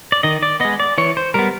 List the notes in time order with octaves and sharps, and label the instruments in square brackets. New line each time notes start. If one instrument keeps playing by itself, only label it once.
[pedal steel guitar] D5
D#3 D#5
D5
G#3 B3 D#5
D5
E3 C#5
C5
G3 B3 A#4